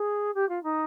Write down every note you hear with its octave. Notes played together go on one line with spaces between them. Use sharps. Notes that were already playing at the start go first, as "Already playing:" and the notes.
Already playing: G#4
G4
F4
D#4